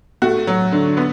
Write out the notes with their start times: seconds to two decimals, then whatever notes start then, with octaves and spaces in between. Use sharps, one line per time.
0.22 A3 F#4
0.47 F#3
0.72 D3
0.97 B3